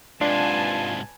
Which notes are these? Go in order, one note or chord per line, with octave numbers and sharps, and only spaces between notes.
G#2 C3 D4 F4 B4 G#5 A5